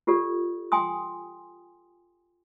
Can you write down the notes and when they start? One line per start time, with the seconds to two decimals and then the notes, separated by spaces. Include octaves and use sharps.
0.07 F4 G4 A4 D5
0.72 G5 G#5 C6 D#6